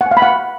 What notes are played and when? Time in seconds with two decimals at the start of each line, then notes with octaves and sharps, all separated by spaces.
0.01 F#5
0.06 G#5
0.11 F5
0.17 B5
0.22 F#5